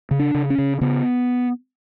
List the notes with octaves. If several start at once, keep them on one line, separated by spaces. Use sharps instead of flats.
C#3
D4
C#3
C#4
C#3
C#3 B3